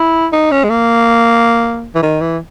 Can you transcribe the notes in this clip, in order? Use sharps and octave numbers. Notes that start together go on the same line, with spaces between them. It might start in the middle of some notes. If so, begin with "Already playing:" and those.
Already playing: E4
D#4
C#4
G#3
A#3
E3
D#3
E3